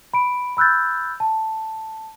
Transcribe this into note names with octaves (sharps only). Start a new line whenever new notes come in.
B5 D7
B5 E6 F#6 G6 A6
A5